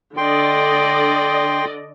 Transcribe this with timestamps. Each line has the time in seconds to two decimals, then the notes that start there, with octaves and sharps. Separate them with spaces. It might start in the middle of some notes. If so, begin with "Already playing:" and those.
0.17 D3 D5 D#5 G5 C6